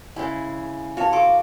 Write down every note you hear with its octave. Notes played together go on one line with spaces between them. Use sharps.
C#3 G#3 E4 G#5
F#4 C#5 F5 A5
A4 F5 C6 D6